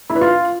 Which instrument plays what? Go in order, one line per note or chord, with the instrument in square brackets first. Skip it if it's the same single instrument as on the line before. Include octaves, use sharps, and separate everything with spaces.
[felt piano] E4
B4
F4